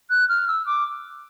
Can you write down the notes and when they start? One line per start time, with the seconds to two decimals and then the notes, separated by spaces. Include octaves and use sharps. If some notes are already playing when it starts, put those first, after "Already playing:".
0.10 F#6
0.28 F6
0.48 E6
0.66 D6